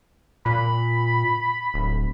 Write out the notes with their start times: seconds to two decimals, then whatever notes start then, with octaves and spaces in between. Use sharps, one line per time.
0.46 A#2 B5
1.74 D1